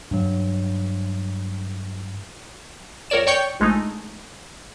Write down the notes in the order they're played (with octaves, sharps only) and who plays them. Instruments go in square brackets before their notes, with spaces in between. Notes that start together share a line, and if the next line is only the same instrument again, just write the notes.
[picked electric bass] G2 F#3
[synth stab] F2 A#4 C#5 D5 E7
C#5 D5 G5 C#6 G6 C#7
A#1 G#3 A3 D#4